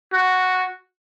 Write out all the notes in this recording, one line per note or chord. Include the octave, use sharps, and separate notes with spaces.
F#4